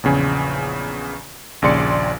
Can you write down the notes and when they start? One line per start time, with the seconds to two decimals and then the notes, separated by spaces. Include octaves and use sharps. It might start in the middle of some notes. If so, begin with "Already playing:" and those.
0.03 A#1 E2 C#3 G#5
1.62 A#1 D#2 C#3 D5 C6 C#7